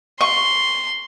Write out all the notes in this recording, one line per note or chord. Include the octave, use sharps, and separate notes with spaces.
C6 C#6